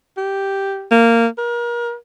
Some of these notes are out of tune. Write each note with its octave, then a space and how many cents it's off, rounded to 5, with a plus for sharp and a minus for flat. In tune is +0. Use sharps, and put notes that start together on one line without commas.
G4 -5
A#3 -15
A#4 +35